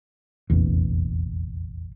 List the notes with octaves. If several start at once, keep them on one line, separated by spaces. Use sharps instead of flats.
F1 A#1 E2